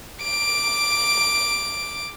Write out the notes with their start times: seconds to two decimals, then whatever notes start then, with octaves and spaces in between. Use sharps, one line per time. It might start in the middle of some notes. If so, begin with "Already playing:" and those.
0.23 D6 D7